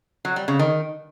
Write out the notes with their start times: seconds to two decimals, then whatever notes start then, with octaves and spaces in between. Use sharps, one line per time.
0.25 F#3
0.36 G3
0.48 C#3
0.59 D#3